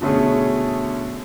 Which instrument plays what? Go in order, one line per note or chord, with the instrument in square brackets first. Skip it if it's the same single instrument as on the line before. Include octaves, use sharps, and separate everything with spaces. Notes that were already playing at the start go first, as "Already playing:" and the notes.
[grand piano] B2 D3 A3 C#4 G#4